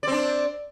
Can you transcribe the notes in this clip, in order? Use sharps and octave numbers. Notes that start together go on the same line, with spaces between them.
C4 D4 D5